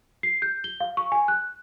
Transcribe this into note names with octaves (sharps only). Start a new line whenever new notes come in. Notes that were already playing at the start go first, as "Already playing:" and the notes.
C7
G6
G7
F5
C#6
G#5
F#6